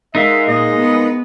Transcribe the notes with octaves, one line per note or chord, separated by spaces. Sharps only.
G#3 D#4 A#4 E5 F5
A#2 G#4 D#5
B3 B4